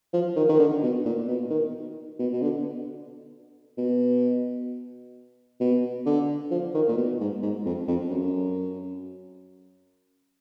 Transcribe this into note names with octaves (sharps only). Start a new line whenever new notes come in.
F3
D#3
D#3
D3
B2
A#2
B2
D#3
B2
B2
D3
B2
B2
D3
F3
D#3
A#2
B2
G#2
G#2
F2
F2
F#2